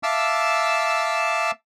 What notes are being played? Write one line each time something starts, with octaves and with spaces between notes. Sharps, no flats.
E5 F5 A5 D6 E6